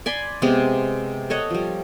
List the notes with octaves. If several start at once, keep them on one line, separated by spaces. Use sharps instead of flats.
D5 G#5 B5 C6
C3 G#3 B3
A4 C#5 D#5 F#5
F3 G3